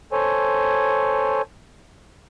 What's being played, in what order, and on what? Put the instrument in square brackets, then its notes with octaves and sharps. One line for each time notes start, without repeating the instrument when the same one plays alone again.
[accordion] A4 C5 C#5 G#5